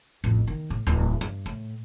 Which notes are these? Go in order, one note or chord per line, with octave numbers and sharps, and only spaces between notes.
A1 F2
D#3
A2
D1 E2
G2
A2